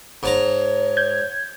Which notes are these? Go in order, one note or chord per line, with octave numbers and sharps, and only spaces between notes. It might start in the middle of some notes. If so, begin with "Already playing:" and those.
G#2 C#5 A5 A#5
G6 G#6